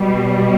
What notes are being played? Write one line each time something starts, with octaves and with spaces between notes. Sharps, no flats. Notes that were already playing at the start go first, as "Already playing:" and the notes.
Already playing: B2 G3